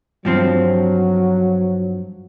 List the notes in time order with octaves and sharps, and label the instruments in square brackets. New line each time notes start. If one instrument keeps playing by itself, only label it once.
[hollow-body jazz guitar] G2 F3 C4 [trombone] F#3